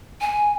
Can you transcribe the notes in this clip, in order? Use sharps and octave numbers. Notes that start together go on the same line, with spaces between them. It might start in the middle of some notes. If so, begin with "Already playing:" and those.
G#5